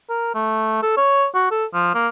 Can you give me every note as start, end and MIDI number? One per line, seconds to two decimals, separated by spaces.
0.09 0.32 70
0.35 0.80 57
0.83 0.93 69
0.97 1.26 73
1.34 1.48 66
1.51 1.65 69
1.74 1.92 53
1.94 2.08 58